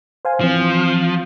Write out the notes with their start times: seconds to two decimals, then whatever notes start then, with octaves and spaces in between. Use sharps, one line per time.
0.25 C5 F5 G#5
0.40 E3 F3 C4